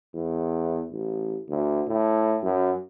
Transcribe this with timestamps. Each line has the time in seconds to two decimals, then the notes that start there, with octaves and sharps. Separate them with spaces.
0.14 E2
0.91 A1
1.49 D2
1.88 A2
2.43 F#2